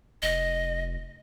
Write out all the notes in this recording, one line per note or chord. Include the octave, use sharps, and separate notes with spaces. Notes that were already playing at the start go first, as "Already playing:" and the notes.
F1 D#5